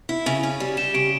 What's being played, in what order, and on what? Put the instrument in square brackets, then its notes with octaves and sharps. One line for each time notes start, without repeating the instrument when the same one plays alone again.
[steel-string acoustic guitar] E4
C#3
C#4
G3
[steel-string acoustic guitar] G4 [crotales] E7
[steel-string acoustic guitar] C#3 [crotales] D7